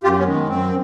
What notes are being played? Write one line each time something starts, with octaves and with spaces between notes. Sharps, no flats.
F#2 F4 G4
B3 C#4
D#3 G#3
B3
F#2 C4